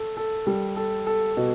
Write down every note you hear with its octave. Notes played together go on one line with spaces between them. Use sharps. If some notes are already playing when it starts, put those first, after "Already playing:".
Already playing: A4
A4
G3
A4
A4
B2